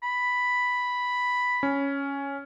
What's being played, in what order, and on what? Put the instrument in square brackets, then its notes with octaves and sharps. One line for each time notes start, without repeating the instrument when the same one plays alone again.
[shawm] B5
[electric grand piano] C#4